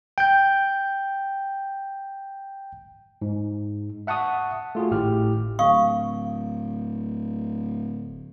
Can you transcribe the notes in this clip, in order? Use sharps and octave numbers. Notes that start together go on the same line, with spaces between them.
G5 G6
G#2
E5 F#5 A5 C#6 D#6
A3 F4 F#4 G#4
G#1 A2 G4 F6
D1 F5 C#6 D#6